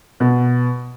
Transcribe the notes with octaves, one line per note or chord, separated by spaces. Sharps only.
B2